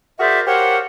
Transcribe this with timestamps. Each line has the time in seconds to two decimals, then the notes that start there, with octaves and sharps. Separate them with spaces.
0.20 F#4 G#4 A#4 C5 D5 E5
0.47 G4 A#4 C5 C#5 F5 F#5